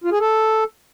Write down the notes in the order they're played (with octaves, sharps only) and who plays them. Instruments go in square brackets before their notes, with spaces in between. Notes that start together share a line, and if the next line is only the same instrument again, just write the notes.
[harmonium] F4
G#4
A4